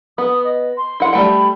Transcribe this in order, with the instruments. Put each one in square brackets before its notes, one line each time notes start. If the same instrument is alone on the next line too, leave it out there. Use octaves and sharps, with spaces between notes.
[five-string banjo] B3 [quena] D#6
[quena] D#5
C6
[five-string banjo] E4 F#5
[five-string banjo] G3 A3 G5 [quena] B5